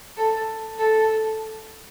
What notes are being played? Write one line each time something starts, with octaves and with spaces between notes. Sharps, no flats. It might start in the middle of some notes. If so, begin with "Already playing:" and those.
A4
A4